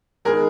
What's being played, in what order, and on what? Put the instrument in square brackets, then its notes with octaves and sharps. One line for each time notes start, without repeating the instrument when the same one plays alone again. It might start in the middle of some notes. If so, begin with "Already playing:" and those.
[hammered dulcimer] D#3 G#3 B3 [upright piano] G#4 A#4